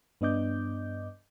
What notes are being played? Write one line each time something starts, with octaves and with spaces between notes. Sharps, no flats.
G2 B3 D4 D#5 D6 G6